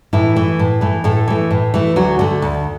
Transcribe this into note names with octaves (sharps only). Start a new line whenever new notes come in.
A2 E3 E4
E3 A3
A2
E3 A3
A2 A3 A4
E3 A3
A2
E3 A3
D2 F#3 F#4
D3 A3
D2